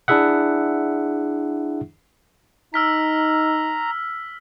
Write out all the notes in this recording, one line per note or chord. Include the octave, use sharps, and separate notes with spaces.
D4 E4 G#4 E5 F#5
D#4 A#5 E6 F6 B6